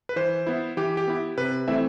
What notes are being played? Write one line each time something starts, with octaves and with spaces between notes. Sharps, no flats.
B4
E3 C5
B3 E4
E3 G4
G4
B3 E4
C3 B4
E3 A3 C4 E4 E5